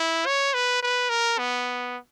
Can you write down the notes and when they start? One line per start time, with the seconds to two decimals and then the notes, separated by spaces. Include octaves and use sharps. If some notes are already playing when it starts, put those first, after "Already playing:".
Already playing: E4
0.26 C#5
0.54 B4
0.82 B4
1.10 A#4
1.38 B3